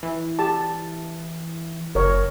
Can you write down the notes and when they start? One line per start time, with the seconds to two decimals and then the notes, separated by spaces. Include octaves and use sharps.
0.03 E3
0.39 G4 A5
1.95 F#1 A#4 C#5